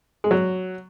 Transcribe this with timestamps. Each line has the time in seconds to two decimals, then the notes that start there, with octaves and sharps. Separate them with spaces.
0.24 G#3
0.31 F#3